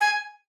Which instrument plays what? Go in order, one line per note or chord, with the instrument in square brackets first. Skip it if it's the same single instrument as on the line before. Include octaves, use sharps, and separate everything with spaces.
[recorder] G#5